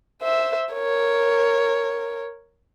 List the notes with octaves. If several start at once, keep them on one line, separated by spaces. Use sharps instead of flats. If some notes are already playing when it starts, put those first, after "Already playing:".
C5 E5
A#4 C#5